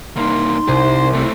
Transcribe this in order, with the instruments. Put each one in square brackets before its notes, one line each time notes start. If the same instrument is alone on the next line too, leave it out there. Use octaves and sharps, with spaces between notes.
[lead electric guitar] C2 A#3 [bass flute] D#4 [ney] C6
[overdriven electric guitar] C2 [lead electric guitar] C5
[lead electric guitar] A3 C4 [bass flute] E4